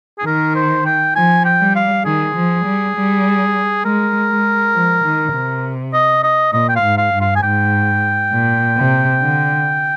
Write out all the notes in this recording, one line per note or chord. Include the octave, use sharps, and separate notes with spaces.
G#4
D#3 A#4
C5
G5
F3 G#5
G5
G3
F5
D#3 G#4
F3
G3
G3
G#3 A#4
G#3
F3
D#3
C3
D#5
D#5
A#2 D#5
G5
F5
G#2
F5
G2
F5
G#5
G#2 G5
A#2
C3
D3